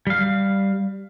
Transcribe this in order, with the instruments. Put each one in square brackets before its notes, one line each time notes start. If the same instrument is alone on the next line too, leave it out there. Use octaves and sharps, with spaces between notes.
[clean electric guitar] G3 F5